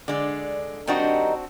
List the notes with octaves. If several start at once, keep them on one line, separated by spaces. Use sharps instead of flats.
D3 G#3 D5
D#3 G3 C4 D4 D#4 F#4